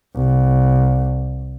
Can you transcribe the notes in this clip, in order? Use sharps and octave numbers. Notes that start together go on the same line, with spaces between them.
C2